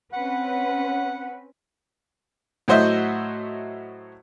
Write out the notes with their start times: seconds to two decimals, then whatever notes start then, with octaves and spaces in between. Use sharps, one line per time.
0.13 C4 C#4 B4 F#5
2.68 A2 F#3 F#4 C5 D#5 E5